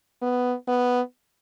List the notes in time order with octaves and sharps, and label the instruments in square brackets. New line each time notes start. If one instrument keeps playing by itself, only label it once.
[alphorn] B3
B3